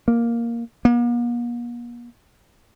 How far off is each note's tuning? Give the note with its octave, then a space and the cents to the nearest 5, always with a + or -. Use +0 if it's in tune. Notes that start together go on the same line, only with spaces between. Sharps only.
A#3 +5
A#3 +45